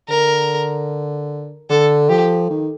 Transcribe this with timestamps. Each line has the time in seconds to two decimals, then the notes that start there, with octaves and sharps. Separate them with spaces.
0.09 D3 A#4
1.70 D3 A4
2.09 F3 G4
2.50 D#3